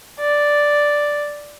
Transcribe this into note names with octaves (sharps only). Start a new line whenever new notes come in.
D5